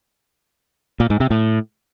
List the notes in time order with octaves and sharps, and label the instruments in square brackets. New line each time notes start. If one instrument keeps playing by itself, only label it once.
[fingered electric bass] A#2
G#2
C3
A2